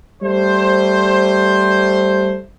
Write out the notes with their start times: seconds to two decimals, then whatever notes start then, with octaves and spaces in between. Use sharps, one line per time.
0.23 G3 A3 C5